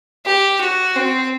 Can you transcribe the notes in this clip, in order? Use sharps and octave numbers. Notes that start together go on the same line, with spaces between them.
G4
F#4
C4